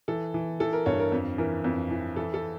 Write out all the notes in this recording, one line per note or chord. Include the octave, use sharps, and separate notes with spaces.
E3 A4
E3
E3 A4
A#4
G2 C#5
A#4
F2
E3 A#4
F2
E3
E3 A4
A4